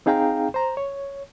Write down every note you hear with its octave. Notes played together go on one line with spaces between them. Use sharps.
C4 D#4 G#4 F5 G5 A#5
C5 A#5
C#5